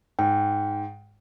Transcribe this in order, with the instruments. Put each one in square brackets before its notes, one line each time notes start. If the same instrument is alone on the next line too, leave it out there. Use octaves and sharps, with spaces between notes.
[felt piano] G#2 [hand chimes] G5